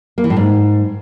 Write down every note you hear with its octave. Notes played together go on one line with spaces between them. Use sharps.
A#3
E3
A2
G#2